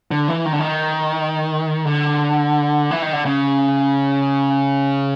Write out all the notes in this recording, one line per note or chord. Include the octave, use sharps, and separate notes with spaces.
D3
E3
D#3
D3
D#3
D3
E3
D#3
D3
C#3